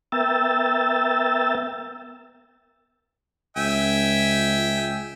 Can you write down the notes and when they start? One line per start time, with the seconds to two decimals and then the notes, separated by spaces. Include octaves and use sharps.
0.12 B3 A#4 E5 G5 E6 A6
3.57 C#2 E5 G5 G#5